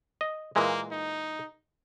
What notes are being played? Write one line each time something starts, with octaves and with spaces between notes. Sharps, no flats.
D#5
A#2 E3 G#3 A#3
D#4